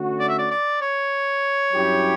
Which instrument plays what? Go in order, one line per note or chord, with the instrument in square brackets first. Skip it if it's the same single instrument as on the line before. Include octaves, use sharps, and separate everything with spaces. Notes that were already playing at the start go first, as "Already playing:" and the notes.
Already playing: [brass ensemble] D3 A3 C#4 F#4
[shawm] D5
E5
D5
D5
C#5
[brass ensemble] G2 F#3 C#4 E4 G4